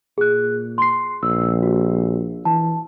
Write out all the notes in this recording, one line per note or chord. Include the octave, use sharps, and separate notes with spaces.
A#2 G#4 F#6
C6 C7
A#1 E6
F#4
E3 A5